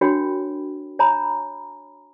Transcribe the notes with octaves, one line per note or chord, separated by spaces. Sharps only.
D4 F#4 A#4 C#5 G5 B5
C#5 G#5 A#5 B5